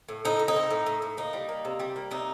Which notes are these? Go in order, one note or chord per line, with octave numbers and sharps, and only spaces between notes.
A2
A2 D#4
A2
D#4
C4
A2
A2
A2
A#3 D#4
G3
A#3
C3
G3
A#3
C3 D#4